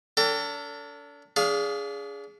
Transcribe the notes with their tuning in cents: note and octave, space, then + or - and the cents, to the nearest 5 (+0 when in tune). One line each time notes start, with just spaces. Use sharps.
D4 -40 A4 +30 G5 +0
D4 -35 G#4 +0 F5 +0